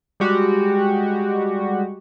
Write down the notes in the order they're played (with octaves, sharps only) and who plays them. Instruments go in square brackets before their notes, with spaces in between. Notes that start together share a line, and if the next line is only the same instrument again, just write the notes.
[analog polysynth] G3 G#3 F#4 G4